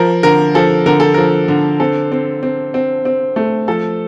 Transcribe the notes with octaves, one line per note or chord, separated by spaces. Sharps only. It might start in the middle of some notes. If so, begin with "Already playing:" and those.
Already playing: F3 A#4
D3 A#4
F3 A4
D3 A#4
A4
F3 A#4
D3
C4 A4
C4
C4
C4
C4
A3
F3 A4